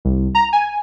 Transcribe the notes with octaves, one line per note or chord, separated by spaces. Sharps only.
C2
A#5
G#5